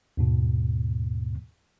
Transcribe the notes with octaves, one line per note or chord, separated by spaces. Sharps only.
D#2 G#2 B2